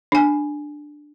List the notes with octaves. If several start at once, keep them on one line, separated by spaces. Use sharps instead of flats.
D4 G#5